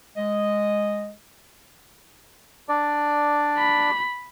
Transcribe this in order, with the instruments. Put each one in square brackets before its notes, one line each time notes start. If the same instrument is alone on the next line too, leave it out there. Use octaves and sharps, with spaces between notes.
[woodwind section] G#3 D#5
[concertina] D4 D5
[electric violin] B5